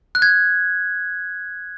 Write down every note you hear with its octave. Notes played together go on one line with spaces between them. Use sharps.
F#6
G#6